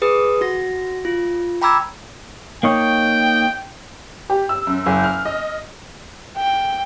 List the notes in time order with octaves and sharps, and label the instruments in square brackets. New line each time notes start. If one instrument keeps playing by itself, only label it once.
[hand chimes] G#4 B4 D#6
F#4 A#6
F4
G5 A#5 B5 D6 E6 G#6
[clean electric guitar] A#3 D#4 C#5 [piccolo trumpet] G5
[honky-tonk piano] G4
E6
F#2
F#1
F6
D#5
[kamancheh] G5